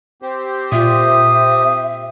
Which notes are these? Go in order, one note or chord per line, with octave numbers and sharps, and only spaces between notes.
C4 G4 C5
A#2 F4 E5 D#6